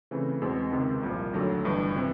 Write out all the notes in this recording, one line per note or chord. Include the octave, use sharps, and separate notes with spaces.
C#3 E3 A3 C4
E2 B2 G#3 C4
C#2 C3 D#3
C2 A#2 F3
D#2 D3 F#3 A3
G1 G2 E3
C3 E3